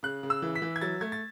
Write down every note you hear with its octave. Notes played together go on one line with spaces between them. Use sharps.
C#3 F#6
C#3
E6
E3
B6
E3
G#6
F#3 A6
A3 G#6
A6